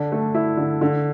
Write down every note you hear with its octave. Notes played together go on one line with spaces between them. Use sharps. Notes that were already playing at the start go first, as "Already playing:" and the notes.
Already playing: D3 D4
A3
E4
D3
D3